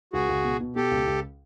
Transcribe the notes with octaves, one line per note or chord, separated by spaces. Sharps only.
C#2 F#4 G#4
C#2
B2
B2
B2 G4 A4
C#2
C#2